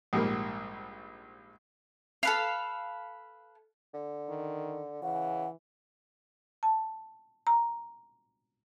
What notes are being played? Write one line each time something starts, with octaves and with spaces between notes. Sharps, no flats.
A#1 G#2 G3 A#3
A4 B4 F5
D3
D#3
C#3 E3 F#5
A5
A#5